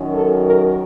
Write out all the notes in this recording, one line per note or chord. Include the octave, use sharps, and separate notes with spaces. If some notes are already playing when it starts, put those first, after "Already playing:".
Already playing: F#2 D#3 F#3
A4
A#4